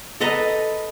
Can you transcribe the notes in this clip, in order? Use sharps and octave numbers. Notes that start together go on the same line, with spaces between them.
A4 B4 D#5 A#5